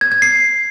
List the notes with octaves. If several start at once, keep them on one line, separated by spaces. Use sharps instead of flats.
G#6
G#6
C7